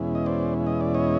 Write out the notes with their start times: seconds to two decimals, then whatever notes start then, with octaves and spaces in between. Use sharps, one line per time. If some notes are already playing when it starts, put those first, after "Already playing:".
Already playing: E2 B2 G#3 C#4 E4
0.15 D#5
0.26 C5 D5
0.67 D#5
0.81 D5
0.94 C#5 D#5